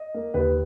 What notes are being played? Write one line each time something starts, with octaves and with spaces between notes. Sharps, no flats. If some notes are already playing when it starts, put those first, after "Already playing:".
Already playing: D#5
A#3
D#2 B4